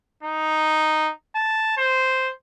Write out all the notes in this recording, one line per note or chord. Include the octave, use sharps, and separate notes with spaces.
D#4
A5
C5